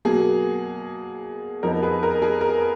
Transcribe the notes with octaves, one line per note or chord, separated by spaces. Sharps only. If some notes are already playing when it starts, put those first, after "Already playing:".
B2 F#3 A#3 G#4
F2 F3 B3 D#4 A#4
G#4 B4
A#4
G#4
A#4